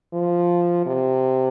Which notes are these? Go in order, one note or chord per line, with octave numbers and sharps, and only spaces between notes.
F3
C3